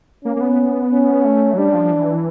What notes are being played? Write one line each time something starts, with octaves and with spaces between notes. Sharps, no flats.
A#3 C#4
A#3
B3
C#4
A3
F#3
G3 D4
F3
E3